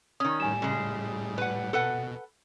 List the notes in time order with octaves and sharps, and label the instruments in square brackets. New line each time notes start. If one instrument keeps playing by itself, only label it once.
[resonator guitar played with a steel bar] D#3 C#4 [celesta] D#6
[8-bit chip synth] A2 G3 [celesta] G#5 E7
[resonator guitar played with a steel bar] C#3 G#3
B4 F#5
[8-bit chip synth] B2 [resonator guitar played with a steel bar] A4 B4 F#5